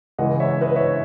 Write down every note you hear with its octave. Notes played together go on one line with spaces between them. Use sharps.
C#2 C#3 E3 G#3 D#5 F#5
C#5 E5
B4 D#5
C#5 E5